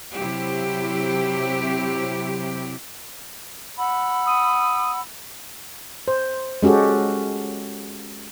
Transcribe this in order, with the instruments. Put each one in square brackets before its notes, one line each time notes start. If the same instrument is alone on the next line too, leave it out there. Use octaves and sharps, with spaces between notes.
[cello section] C3 F#3 E4 G4
[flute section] F#5 B5 E6
[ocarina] D#6
[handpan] C5
G#3 C#4 F#4 G4 A4